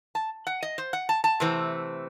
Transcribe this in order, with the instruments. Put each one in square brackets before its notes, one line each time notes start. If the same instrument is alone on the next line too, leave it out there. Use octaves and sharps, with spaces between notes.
[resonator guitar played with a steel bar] A5
F#5
D#5
C5
F#5
A5
A5
C3 E3 A3 C4